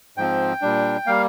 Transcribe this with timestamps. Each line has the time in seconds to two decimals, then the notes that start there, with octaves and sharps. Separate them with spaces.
0.18 G#2 F3 C4 G5
0.62 A#2 G3 D4
1.06 G3 A#3 F5